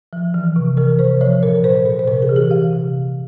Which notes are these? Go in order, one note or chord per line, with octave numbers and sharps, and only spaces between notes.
F3
E3
C3
E3 A#4
C3 C5
F3 C#5
A#2 A#4
A#2 C5
A#2
C5
C3 A#4
G#4
E3
G4
E3 F5
C3